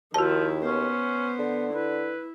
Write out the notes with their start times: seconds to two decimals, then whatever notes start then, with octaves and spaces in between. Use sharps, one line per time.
0.14 D#2 D#3 F3 E4 F#4 A5
0.65 B3 C#4 C5
1.39 D3
1.73 E4 B4